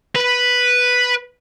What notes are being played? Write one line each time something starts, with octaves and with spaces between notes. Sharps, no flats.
B4